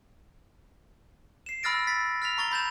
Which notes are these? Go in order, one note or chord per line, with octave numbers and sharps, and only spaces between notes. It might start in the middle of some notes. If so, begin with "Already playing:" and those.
C7 E7
B5 E6 F6 A6 A#6 D7
A6 B6
F6 A6 B6 F7
A#5 C#6 A6 G7
B5 G6 A6 E7